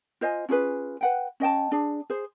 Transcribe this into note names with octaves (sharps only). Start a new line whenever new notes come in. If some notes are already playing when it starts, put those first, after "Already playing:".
F4 C5 D#5 G#5
C#4 F4 G#4 B4
B4 F#5 G5
C#4 D#5 G5 A5
D4 G#4
G#4 C5